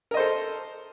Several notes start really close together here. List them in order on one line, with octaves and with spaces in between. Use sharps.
A#4 D#5 C5 A4